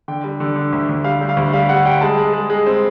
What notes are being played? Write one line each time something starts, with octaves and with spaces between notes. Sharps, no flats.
D3 G5
G3
D3
D3
D2
D2
G3 F5
G3
F5
D2
G3 F5
G3 F#5
G3 G5
G#3 A5
G#3
G#3
G#3
C4